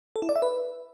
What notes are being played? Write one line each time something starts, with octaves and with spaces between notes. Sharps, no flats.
A4
E4
D5
E5
B4